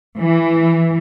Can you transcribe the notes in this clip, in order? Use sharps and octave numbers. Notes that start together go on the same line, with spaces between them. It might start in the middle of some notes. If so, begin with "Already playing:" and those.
E3